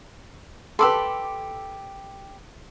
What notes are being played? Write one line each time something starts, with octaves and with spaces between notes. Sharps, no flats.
G4 A4 B4 A5 B5 C6 D6 E6